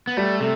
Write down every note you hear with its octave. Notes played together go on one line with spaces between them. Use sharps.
B3
G3 A3
C3 A3